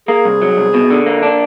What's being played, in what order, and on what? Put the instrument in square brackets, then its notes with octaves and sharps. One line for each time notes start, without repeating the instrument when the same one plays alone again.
[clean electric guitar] A#3 [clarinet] G#4
[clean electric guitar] C2
F#3
C2
B2
D3
A#3
D4